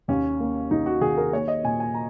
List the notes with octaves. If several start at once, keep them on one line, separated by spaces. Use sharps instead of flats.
D#2 C#4
A#3
D#2 D#4
F#4
D#3 G#4
A#4
A#3 C#5
D#5
A#2 G#5
G#5
A#5